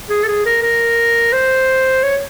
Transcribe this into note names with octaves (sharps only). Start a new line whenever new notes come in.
G#4
A4
G#4
A#4
A#4
C5
C#5